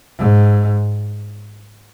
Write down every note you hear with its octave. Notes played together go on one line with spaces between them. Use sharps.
G#2